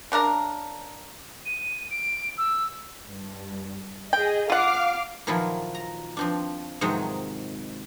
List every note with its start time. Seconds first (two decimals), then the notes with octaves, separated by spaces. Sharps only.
0.12 C#3 D4 A#4 A#5
1.46 D#7
1.91 D7
2.38 E6
3.06 G2
4.13 G#4 D#5 G5
4.50 F4 F5 F#5 D6 F6
5.27 A#2 D#3 F3 F#3 E4 F4
5.75 A#5
6.17 F3 C4 D4
6.81 G#2 C3 D#3 F3 F#3 G#3